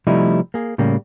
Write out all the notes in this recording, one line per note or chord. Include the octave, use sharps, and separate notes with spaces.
C3 F3 G3 A3 D#4 E4
A#3 G#4
A2 C#3 G3 A#3